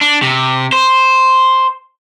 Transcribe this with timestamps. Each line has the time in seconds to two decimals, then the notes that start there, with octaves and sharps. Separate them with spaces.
0.01 D4
0.22 C3
0.73 C5